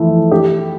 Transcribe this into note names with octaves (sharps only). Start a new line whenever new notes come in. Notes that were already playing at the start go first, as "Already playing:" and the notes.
Already playing: E3 F3 A3
G4